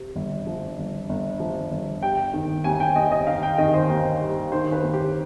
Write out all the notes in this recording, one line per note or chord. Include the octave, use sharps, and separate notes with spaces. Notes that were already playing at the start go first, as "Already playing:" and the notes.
Already playing: C3
G1
F3
G1
G1
F3
G1
G3 G5
D#3
D#2 G#5
G5
D#2 D#5
D#5
D#3 F5
G5
D#3 D#5
C5
D#2
G3
D#3 C5
B4
D#2
G4